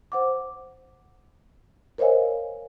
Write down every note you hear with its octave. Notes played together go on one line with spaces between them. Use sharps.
C5 F#5 D6
A#4 C5 C#5 D#5 F5 G#5